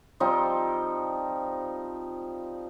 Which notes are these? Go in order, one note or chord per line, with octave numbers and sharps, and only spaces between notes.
F3 G3 C4 D#4